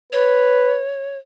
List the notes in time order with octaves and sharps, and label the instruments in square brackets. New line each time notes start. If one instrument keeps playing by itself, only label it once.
[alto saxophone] B4 [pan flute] C#5